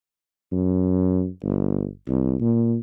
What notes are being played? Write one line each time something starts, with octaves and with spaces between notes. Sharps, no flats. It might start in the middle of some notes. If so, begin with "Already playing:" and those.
F#2
G1
C2
A#2